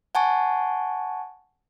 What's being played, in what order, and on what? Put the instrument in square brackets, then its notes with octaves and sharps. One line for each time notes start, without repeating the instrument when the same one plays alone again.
[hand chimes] F#5 G#5 A5 C#6